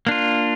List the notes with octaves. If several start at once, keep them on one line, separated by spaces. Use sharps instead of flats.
A#3 D4 F4